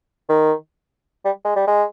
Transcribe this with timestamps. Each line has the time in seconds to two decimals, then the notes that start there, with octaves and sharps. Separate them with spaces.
0.29 D#3
1.25 G3
1.45 G#3
1.56 G3
1.67 G#3